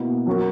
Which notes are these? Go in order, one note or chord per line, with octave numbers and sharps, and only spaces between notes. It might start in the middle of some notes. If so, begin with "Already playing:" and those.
Already playing: B2 A#3 E4
F#3 C#4 F#4 A#4